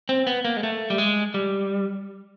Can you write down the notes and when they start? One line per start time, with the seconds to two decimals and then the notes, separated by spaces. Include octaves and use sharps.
0.09 C4
0.27 B3
0.45 A#3
0.57 G#3
0.63 A3
0.90 G3
0.98 G#3
1.34 G3